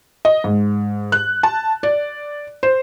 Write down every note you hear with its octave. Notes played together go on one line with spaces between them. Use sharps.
D#5
G#2
F#6
A5
D5
C5